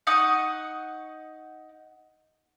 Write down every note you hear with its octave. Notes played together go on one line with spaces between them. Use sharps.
D#4 F#5 C#6 D#6